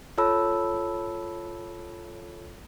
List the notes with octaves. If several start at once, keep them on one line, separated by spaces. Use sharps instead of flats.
F4 A4 C#5 A5 B5 E6